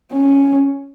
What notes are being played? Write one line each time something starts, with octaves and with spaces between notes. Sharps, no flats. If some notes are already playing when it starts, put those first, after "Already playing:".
C#4